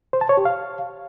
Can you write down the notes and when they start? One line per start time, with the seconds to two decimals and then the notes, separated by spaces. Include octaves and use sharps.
0.13 C5
0.21 A5
0.29 C#5
0.37 G4
0.45 F5